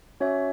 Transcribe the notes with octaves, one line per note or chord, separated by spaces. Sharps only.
C#4 F#4 C#5 E5